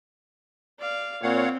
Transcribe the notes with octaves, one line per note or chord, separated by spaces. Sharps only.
D5 F5
A#2 C4 C#5 F5 F#5